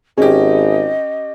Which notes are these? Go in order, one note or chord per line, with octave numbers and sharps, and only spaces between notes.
G#1 C#4 G4 G#4 D#5